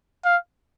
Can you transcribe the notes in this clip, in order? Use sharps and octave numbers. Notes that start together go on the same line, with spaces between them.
F5